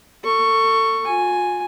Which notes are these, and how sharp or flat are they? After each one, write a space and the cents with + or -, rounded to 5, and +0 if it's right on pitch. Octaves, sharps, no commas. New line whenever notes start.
A4 +35 C#6 +0
F4 +40 G#5 +0